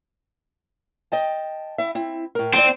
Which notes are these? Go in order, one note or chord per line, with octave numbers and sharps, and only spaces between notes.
D#5 G5 A5
E4 E5
C4 E4
A2 A#4
D#2 C4 C5 D5